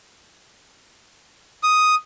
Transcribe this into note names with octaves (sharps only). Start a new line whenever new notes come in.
D#6